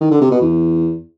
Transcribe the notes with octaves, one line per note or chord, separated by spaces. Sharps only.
D#3
D3
C3
B2
E2